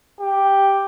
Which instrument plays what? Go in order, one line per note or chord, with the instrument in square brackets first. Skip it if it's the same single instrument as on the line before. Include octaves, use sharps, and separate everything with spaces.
[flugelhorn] G4